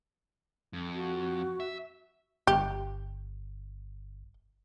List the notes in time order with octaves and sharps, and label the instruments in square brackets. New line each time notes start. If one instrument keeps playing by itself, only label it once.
[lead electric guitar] F2
[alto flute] F#4
[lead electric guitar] E5
[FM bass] G1 [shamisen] G4